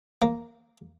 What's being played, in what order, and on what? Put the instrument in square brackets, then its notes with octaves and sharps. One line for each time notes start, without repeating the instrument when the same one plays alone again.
[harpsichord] A#3